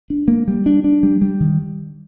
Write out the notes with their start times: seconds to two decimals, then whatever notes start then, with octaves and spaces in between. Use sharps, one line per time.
0.10 D4
0.28 A#3
0.48 G3
0.66 D4
0.84 D4
1.03 G3
1.22 G3
1.40 D#3